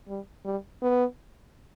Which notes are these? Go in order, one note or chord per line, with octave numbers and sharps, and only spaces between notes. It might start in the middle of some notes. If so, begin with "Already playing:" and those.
G3
G3
B3